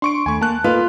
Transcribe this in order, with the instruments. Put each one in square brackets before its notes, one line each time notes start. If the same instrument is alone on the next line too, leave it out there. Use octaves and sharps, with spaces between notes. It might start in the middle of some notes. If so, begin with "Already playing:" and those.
[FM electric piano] D4 [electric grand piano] C6 C#6 D7
[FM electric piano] D#2 A3 B5 [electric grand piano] G#5 C#6
[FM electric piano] A#3 [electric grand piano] A5 F#6
[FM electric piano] A#3 A4 D#5 [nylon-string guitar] F4 [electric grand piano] B4